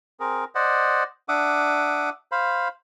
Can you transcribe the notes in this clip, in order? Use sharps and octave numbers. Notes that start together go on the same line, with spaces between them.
C4 G#4 A#4
C5 D5 D#5 F#5
D4 E5 F#5 D6 D#6
C5 F5 B5